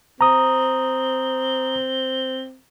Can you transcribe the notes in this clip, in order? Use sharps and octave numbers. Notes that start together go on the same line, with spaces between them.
C4 A#5 D#6